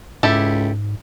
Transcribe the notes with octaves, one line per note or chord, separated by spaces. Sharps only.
C#2 G#2 E4 G4 A4